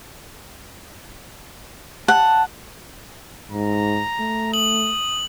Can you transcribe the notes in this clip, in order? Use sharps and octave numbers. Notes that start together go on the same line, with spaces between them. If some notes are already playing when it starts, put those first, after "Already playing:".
F#5 A5
G#2 A#5
A3
D#6 F#7